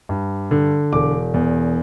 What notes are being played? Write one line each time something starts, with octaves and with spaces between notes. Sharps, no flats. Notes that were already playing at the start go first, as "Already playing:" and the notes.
G2
D3
E1 D6
E2